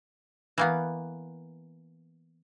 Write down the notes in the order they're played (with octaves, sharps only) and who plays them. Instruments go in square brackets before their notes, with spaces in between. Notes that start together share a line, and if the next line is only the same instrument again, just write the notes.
[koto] E3 A#3 B3